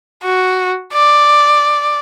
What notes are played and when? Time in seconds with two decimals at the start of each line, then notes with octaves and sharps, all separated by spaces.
0.23 F#4
0.93 D5